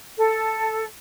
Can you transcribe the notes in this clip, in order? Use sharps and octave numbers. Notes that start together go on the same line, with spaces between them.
A4